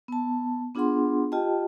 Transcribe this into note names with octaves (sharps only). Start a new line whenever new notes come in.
B3 A5
B3 D4 F4 G#4 F#5 C6
F4 G4 D#5 G5 A5